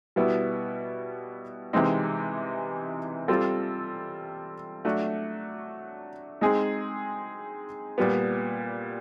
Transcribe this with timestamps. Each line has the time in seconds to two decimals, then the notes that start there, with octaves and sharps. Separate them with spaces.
0.16 B2 G3 B3 E4
1.73 C3 E3 G#3 C4 D#4
3.28 G3 C4 F4 A4
4.85 F#3 A3 D4 F#4
6.41 G#3 C4 D#4 G#4
7.98 A#2 G3 B3